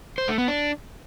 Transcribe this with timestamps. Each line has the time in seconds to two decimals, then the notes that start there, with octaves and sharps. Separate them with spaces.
0.18 C5
0.28 A3
0.38 B3
0.48 D4